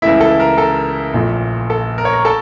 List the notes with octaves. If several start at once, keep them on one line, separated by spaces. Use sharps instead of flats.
C#2 C#3 E3 A3 E4 E5
A4
A#4
A4
A#1 A#2 F3 A3
A4
A#4
C#5
A#4
A4 A5